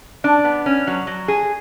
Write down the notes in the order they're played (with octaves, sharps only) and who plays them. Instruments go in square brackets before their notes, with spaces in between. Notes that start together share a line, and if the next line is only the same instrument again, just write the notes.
[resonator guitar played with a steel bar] D4
B3
C#4
F#3
F#3
G#4